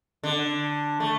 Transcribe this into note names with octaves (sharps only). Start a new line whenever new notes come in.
D3
A3